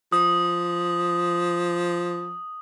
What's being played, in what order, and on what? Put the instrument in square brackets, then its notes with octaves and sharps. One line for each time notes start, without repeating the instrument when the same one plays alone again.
[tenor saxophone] F3 [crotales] D#6